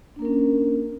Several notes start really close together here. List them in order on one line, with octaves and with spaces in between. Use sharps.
D4 A#3 A#4 C#4